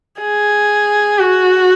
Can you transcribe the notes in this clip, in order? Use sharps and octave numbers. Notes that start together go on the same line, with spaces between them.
G#4
F#4